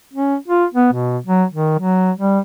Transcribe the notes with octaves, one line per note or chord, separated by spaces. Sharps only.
C#4
F4
B3
B2
F#3
D#3
F#3
G3